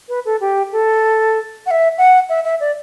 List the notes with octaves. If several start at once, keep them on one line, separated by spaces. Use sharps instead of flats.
B4
A4
G4
A4
F#5
E5
F#5
E5
E5
D5